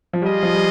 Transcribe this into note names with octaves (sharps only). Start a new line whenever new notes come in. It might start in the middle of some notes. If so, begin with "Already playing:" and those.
F3
G3 F4 G#4 D#5
F3
G3